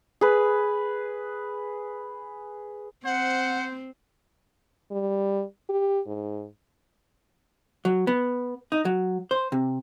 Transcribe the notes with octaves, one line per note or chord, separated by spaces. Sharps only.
G#4 B4
C4 C5 F#5
G3
G4
G#2
F#3
B3
D#4
F#3
C5
C3